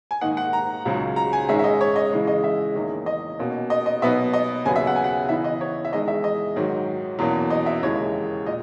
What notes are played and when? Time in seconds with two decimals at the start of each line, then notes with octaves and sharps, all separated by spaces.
0.11 G#5
0.21 G#2 D#3 A#3 D#4 F#5
0.37 F#5
0.53 A#5
0.85 C#2 C#3 F#3
1.16 A#5
1.33 G#5
1.49 G#2 D#3 G#3 C#4 E5
1.59 E5
1.64 D#5
1.81 C#5
1.96 D#5
2.12 C#3 E3 G#3 D#4
2.27 D#5
2.44 E5
2.75 E2 D#3 A#3 C#4
3.06 D#5
3.39 B2 A#3 C#4
3.70 D#5
3.86 D#5
4.02 B2 F#3 B3 D#4 E5
4.34 D#5
4.66 D#2 C#3 F#3 B3 G#5
4.76 E5
4.87 F#5
4.96 G#5
5.04 F#5
5.29 C#3 E3 B3 D#4 E5
5.44 D#5
5.61 C#5
5.85 E5
5.93 E2 D#3 G#3 D#5
6.08 E5
6.24 D#5
6.56 G#2 D#3 F#3
7.19 E2 B2 F#3 A#3 C#4
7.50 D#5
7.66 E5
7.83 D#2 C#3 E3 G#3 D#4 C#5
8.46 A#2 D#5